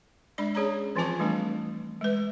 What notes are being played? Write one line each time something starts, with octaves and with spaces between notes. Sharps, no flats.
G#3 D4 D5 B5
C#4 G#4 C#5 D5 A#5 B5
E3 F3 C4 F4 A5 D6
E3 G3 A3 D4
G#3 B4